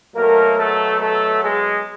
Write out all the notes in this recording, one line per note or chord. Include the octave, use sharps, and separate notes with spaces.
B2 F#3 A3 A#3 A#4
A3 A4
A3 A4
G#3 G#4